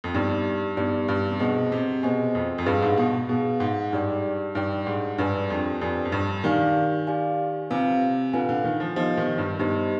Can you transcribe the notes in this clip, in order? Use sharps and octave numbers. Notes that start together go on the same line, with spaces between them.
F2
G2 B3 D#4 G4 D5
G2 B3 D#4 G4 D5
G2
C3
B2 G#4 C5 D#5 G#5
C3
B2 G#4 C5 D#5 G#5
F2
F2
G2 G#4 B4 F5
G#2
B2
B2 G#4 B4 F5
G#2
G2 D#4 G4 D5 G5
G2 D#4 G4 D5 G5
G#2
G2 D4 G4 B4 D5 G#5
F2
F2 D4 G4 B4 D5 G#5
F2
G2
D#3 G4 D5 F5 G#5
G4 D5 F5 G#5
C3 F4 B4 F5 G#5
D3 F4 B4 F5 G#5
D3
D#3
F3
F3 B3 D#4 G4 C5 D#5
D#3
G2
G2 B3 D#4 G4 C5 D#5